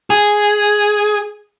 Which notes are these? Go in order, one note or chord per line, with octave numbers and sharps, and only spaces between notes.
G#4